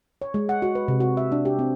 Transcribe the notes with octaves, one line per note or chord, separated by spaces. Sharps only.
C#5
G#3
F#5
F#4
B4
C3
F#4
E5
D4
G4
C4